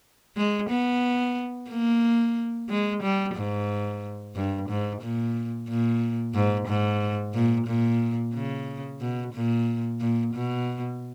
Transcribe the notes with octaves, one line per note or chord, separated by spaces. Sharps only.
G#3
B3
A#3
G#3
G3
G#2
G2
G#2
A#2
A#2
G#2
G#2
A#2
A#2
C#3
B2
A#2
A#2
B2